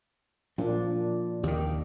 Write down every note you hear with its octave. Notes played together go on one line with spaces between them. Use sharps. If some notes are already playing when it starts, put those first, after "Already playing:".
A#2 F3 D4
D#2 D#3 G4